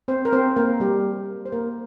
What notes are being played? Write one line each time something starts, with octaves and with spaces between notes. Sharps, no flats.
C4 C5
A#4
C4 C5
A#3 A#4
G3 G4
C5
A#3 A#4